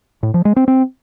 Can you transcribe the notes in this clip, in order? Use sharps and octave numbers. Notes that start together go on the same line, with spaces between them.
A2
F3
G#3
C4
C4